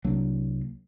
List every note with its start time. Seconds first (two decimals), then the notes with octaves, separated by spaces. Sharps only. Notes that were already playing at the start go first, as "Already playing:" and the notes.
0.04 C2 F#3 A#3 D4